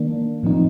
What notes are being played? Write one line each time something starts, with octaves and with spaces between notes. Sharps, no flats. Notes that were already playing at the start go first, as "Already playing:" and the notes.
Already playing: D#3 A#3 D4
A2 F3 C4 D#4